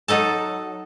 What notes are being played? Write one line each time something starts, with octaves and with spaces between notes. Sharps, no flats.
F#3 D#4 A4 A5